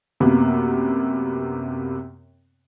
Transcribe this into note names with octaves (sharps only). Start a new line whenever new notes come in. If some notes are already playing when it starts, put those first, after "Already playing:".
F#2 C3 A#3 B3